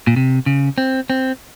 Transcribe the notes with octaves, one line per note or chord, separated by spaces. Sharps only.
A#2
C3
C#3
C4
C4